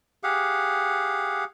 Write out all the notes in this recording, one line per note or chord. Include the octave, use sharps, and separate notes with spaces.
G4 G#4 F5 F#5